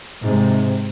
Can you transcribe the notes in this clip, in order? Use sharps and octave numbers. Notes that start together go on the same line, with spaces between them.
G#2 C3